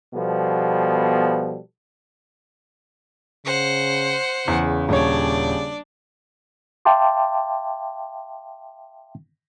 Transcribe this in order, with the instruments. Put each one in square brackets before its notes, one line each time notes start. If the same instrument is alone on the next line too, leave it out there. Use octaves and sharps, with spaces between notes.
[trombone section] B2 F3 G3 B3 A4
[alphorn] C#3 [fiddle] C5 F#5
[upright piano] E2 [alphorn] C#3
[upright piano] D#1 C#5 [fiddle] D4 D5
[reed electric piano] E5 F5 G5 A5 C6 D6